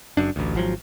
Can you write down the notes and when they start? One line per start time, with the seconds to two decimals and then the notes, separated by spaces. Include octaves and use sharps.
0.17 F#1 F#2 D4
0.36 A1 D2
0.55 G#1 F3 F#3